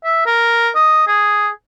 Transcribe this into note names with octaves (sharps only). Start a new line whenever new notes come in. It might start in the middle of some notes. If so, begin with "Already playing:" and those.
E5
A#4
D#5
G#4